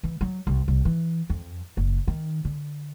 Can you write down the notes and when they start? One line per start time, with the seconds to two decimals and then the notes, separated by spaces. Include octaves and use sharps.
0.03 E3
0.21 F#3
0.47 C2
0.68 C2
0.85 E3
1.30 F2
1.77 F#1
2.07 D#3
2.45 D3